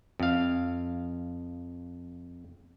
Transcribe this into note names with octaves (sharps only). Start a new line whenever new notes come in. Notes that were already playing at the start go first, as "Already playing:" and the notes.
F2 F5